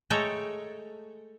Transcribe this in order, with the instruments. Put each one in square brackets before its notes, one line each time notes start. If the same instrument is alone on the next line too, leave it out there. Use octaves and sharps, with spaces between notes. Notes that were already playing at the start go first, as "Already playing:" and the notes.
[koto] G#3 A3 A4 C#5 G5 A#5